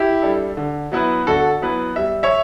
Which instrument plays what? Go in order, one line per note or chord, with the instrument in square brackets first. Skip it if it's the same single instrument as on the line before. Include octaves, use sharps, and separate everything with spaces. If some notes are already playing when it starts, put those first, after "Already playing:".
Already playing: [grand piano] E4 G4
[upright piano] G3 D4 A4
D3
F#3 B3 E4 B4
[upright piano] D3 [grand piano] F#4 A4
[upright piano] F#3 B3 E4 B4
[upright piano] G3 [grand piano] E5
[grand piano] C#5 E5